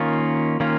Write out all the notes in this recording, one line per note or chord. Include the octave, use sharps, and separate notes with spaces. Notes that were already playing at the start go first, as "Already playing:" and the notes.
Already playing: D#3 A#3 C#4 F4
D#3 A#3 C#4 F4